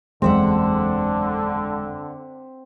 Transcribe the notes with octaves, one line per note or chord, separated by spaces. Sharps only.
F#1 E2 D3 F#3 G#3 C4 E5 F#5